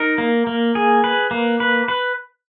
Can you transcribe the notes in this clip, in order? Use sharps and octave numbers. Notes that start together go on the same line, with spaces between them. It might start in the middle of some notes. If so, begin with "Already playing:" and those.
Already playing: D#4 A#4
A#3
A#3
G#4
B4
A#3
B4
B4